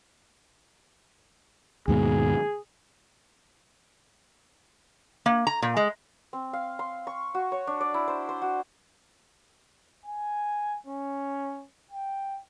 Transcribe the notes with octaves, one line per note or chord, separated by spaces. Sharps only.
D#2 G#2 B2 G#4
A#3
A#5
A#2
G#3
C4
F5
C6
C#6
F#4
C#5
D4
D5
E4
C5
C5
F#4
G#5
C#4
G5